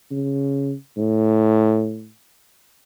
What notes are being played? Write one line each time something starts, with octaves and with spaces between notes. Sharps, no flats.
C#3
A2